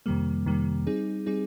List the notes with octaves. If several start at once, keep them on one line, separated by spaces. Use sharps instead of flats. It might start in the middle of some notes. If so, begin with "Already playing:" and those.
F2 C3 D#3 G3 A#3
F2 C3 D#3 G3 A#3
G3 C4 D#4 G#4
G3 C4 D#4 G#4